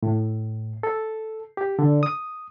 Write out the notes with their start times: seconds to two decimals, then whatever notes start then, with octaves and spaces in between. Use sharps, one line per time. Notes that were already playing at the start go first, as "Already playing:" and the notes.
0.03 A2
0.83 A4
1.57 G4
1.79 D3
2.03 D#6